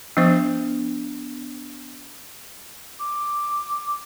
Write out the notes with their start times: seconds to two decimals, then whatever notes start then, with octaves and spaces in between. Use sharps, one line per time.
0.17 F3 B3 D4 C5
2.99 D6